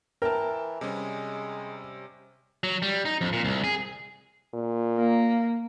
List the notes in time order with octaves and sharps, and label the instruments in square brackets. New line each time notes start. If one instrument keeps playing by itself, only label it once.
[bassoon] E3 [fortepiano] A#4 [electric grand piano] G5 A5
[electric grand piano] C3 G3 C#4 [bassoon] G#3
[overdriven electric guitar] F#3
G3
D#4
F2
A#2
C2
G#4
[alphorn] A#2
[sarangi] A#3